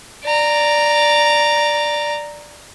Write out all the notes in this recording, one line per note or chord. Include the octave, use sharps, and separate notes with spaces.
D5 A#5